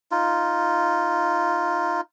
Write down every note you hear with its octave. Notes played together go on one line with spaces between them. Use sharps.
D#4 F4